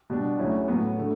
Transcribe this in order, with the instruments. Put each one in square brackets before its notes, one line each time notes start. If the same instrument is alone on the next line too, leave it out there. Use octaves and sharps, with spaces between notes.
[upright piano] B2 G3 D4
D2 C#3 F#3 C#4 E4
A2 F#3 B3
D3 A3